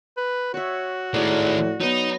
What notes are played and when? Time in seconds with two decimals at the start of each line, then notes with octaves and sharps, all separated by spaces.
0.17 B4
0.54 F#4 C#5 E5
1.14 A2 D#3 G#3 D5
1.80 F#3 B3 D#4